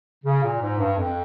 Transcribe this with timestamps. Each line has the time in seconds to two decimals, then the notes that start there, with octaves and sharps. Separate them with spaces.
0.25 C#3
0.42 A#2
0.61 G#2
0.79 G2
0.97 F2